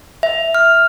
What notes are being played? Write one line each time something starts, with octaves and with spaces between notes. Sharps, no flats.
E5
F6